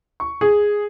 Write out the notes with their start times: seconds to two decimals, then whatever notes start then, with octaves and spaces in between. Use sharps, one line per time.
0.20 C#6
0.41 G#4